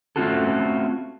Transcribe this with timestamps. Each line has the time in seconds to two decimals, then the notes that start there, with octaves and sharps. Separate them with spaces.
0.16 A3 C4 C#4 F4 F#4 A4